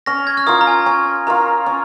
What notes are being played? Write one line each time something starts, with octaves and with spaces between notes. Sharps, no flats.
C#4 A#6
G#6
F6
F4 A#4 F5 D#6
A#5
G#5
C#4 G#5
F4 A#4 F5 A#5
C#4